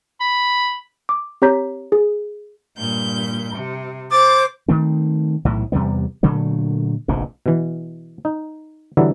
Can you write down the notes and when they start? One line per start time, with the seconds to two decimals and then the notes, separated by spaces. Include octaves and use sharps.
0.20 B5
1.09 D6
1.42 C4 G4 C#5 A#5 G6 B6
1.92 G#4
2.78 G2 A#2 G6
3.55 C3
4.12 C5 D6 A6
4.68 D#3 A3 C4
5.45 B1 A2 E3
5.72 E2 C3 G3 B3
6.23 A#2 D3 F#3 A3
7.08 F1 A#1 G#2
7.46 B2 E3
8.25 D#4
8.97 D3 E3 F#3 G3 B3 E4